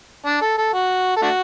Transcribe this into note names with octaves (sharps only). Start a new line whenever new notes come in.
D4
A4
A4
F#4
A4
A3 D4 F#4